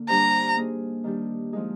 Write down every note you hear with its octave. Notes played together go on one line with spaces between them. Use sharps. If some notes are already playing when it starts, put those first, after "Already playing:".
Already playing: D3 A#3
G3 D4 G4 C5 A#5
A#3 D#4 G#4
D#3 G3 D4 G4
F3 G#3 D#4 G#4